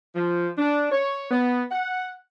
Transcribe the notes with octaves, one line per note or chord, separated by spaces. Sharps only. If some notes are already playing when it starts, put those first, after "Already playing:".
F3
D4
C#5
B3
F#5